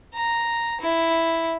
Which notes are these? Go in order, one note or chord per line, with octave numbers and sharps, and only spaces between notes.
A#5
E4